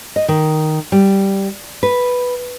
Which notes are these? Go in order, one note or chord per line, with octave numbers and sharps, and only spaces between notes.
D#5
D#3
G3
B4